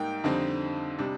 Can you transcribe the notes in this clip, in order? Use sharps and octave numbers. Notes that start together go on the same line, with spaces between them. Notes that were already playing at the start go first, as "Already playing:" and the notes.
Already playing: G#2 G3 A#3 D#4 G5
F2 D3 G3 C4 D#4 D#5
C3 G3 D4